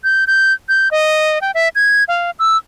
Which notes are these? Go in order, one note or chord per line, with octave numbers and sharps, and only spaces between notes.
G6
G6
G6
D#5
G5
E5
G#6
F5
E6